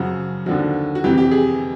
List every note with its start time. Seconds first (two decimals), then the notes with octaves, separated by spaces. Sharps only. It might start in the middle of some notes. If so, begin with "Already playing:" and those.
Already playing: F#2 C#3 F3 F#4
0.46 D#2 D3 F3 F#4
0.95 F#4
1.04 F2 C3 E3 G4
1.18 G4
1.31 G#4